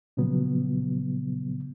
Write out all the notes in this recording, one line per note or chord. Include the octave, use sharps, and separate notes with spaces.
A#2 C#3 F3 F#3 B3